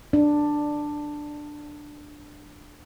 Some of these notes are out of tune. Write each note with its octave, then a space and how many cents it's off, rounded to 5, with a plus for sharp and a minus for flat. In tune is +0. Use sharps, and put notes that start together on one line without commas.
D4 +10